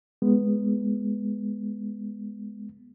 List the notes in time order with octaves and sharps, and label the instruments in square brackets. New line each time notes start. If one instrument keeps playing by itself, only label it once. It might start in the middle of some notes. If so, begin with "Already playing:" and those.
[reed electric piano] G#3 B3